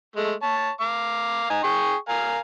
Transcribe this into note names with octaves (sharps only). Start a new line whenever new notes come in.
G#3 A3
C#5 A5
F5 D6
D#4 G#5
G#4 G5 C#6
A#4 F5 G#5